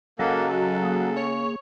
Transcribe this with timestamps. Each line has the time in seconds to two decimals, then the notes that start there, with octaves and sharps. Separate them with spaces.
0.19 C#3 F#3 A#3 A4 D#5
0.49 A4
0.83 A#3 G#4
1.17 C#5